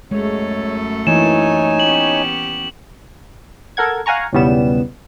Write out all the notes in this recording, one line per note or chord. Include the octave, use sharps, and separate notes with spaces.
F#2 G#3 A3 A4 C#5
E3 A#3 D#4 C#5 G#5 E7
B3 C#4 G4 F#7
A4 A#4 F#5 G#6
F5 F#5 G#5 A#5 C#6
B1 E2 C#3 G3 B3 E7